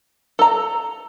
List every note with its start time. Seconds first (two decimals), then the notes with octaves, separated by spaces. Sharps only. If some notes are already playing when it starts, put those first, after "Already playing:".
0.39 A4 A#5